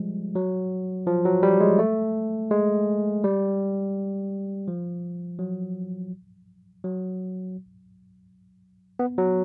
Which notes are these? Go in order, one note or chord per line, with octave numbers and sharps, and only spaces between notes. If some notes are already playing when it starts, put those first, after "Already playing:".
Already playing: F3 G3 G#3
F#3
F3
F#3
G3
G#3
A3
G#3
G3
F3
F#3
F#3
B3
F#3